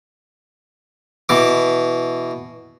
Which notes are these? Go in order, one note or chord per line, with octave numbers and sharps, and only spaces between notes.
B2 E3 D6